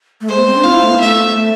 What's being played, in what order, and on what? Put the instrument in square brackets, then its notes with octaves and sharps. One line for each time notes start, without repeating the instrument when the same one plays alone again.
[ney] A3
[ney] G#3 [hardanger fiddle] C5
[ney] B3
C4
D4
[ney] F4 [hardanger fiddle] F5
[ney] E4
A3
B3
[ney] A3 [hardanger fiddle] E5
[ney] A3